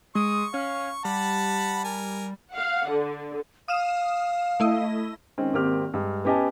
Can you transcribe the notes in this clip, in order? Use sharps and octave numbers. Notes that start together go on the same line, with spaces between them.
G#3 C#6 D#6
C#4 F5
G3 F#5 A5 B5
A#4 G#5
F5 F#5
D3
F5 D#6 F6 E7
A3 E4 D#5
D#3 G#3 C4 C#4
G#1 A#3 C4 G4 F6
G2 G#3
B3 C#4 G4 D#5 G#5 A5